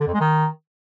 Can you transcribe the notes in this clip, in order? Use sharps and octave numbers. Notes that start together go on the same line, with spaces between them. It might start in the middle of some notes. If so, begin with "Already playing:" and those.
D3
F2
G#3
D#3